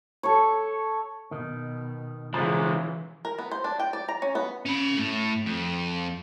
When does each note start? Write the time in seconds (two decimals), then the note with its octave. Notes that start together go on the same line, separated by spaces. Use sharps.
0.23 A4 C#5
1.31 B2 D#3
2.34 C#3 E3 F3 G#3 G#5 A#5
3.25 A#4
3.38 B3
3.51 C5
3.64 D4
3.80 G5
3.93 D5
4.08 A#5
4.22 C#4
4.35 B3
4.65 C#4 B5
4.98 A2
5.46 F2